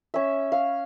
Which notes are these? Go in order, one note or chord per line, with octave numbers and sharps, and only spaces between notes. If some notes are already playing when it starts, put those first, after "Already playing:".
C#4 E5
F5